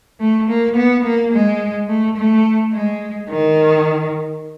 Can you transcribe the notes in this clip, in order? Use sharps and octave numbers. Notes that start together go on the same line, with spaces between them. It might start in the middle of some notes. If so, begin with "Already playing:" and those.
A3
A#3
B3
A#3
G#3
A3
A3
G#3
D#3